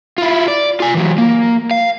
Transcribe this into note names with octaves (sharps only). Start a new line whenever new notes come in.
E4 F4
D5
F4 G#5
E3 F#3
A#3
F5